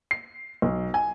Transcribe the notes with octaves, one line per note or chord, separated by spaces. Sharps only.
C7
B1
G#5